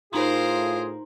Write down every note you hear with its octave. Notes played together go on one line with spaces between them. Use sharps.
A2 D#4 F4 G#4 A#4 C5 A#5 C6